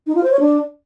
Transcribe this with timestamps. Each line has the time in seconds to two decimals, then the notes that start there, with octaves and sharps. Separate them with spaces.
0.06 D#4
0.15 F4
0.23 C5
0.31 C#5
0.40 D4